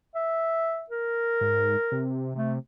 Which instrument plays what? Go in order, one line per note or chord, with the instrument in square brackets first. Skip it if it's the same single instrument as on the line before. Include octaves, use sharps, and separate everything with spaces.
[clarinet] E5
A#4
[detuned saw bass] G#2
C3
[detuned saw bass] C3 [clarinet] A3